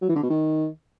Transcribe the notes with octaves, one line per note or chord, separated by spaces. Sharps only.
F#3
E3
D3
B2
D#3